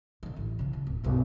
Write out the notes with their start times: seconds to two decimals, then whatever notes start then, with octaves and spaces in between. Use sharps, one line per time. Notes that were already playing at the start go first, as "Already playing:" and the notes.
0.23 D3 D#3
0.36 A1
0.59 C#3 E3
0.73 C#3
0.87 D1
1.04 B1 G2